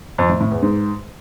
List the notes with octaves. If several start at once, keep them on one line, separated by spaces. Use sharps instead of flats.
F2
A2
A2
E2
G#2